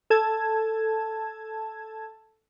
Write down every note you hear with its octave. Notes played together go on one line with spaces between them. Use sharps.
A4 A5 G#6